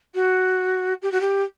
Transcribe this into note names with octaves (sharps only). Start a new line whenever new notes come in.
F#4
G4
F#4
G4